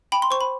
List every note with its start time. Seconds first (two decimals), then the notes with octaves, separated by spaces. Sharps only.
0.12 G5 B5
0.22 C6
0.31 C5 C#6
0.41 B5